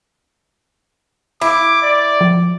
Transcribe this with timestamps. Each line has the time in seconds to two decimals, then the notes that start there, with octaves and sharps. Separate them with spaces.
1.41 E4 D6
1.82 D5
2.21 F3